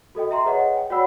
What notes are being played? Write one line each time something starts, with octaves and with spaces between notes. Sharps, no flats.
F#4 A4 D#5 G5
E5 A#5 C6
G#4 B4 C#5 D#5 F#5
G5
F#4 C#5 D5 F#5 B5 E6